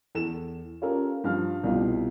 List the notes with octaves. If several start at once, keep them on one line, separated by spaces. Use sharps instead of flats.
E2 A4 E7
C#4 F4 G4 A4 A#4
G2 F3 F5 F6
C2 B2 C4 F4 G4